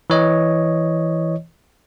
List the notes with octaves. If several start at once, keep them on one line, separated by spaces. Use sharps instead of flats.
E3 C#5 D#5